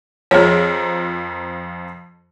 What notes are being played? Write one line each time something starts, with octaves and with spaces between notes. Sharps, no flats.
F2 F3 G#4 A#4 C#5